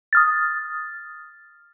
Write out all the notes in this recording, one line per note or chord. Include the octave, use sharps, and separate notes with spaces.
D#6 F6 A6